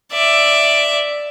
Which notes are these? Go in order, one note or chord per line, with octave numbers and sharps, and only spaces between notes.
D5 E5